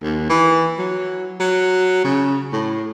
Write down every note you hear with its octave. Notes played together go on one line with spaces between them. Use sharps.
D#2
E3
F#3
F#3
C#3
A2